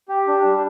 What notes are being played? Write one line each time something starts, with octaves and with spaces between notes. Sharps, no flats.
G4
D4
G3